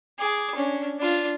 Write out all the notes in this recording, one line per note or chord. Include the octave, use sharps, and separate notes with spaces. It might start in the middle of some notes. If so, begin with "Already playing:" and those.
G#4 D6
C#4 D4
D4 F4